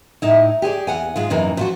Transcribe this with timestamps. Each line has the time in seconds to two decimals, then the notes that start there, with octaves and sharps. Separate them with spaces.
0.22 A2 D#4 E4
0.62 G4 G#4 C#5 D5
0.87 E2 F#5 G#5
1.16 G#2 G#3 F4
1.30 F#2 C3 E3 A#3 D#4
1.57 F3 F4 F#4